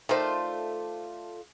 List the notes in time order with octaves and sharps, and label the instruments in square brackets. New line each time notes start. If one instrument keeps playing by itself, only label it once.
[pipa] D#3 C5 [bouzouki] A3 F4 D5